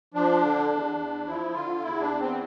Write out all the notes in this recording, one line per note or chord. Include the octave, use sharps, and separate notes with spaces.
F3 D4
D3
E2
E2
F3 E4
D3 F4
E2 E4
D4
E2
C4